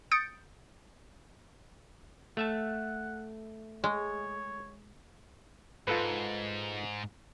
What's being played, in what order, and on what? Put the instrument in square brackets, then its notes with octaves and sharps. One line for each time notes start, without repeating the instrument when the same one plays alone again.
[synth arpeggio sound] D#6 G6 A6 C#7 D7
[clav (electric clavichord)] A3 E5 A5 [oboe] F#5
[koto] G#3 [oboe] C#5
[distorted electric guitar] G#2 [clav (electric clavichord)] F4 A4 B4